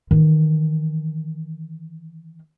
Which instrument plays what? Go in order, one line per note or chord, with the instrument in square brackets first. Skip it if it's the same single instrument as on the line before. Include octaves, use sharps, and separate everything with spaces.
[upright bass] D#3 E3